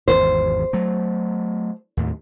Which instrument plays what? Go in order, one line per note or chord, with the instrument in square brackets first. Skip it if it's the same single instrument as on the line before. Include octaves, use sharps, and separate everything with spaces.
[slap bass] G#1 E2 [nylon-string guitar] C5
[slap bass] F#3 A3
D#2 A2